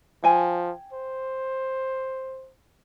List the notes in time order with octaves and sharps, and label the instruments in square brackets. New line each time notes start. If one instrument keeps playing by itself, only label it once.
[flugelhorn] F3 [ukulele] G5 G#5
[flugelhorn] C5